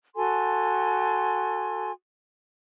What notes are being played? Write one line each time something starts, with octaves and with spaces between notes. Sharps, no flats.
F#4 A4 G#5 C6